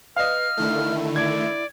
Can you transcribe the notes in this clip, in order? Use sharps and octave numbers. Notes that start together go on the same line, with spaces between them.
B4 D#5 F5 F6
D3 D#3 A3 E4
D5 G#6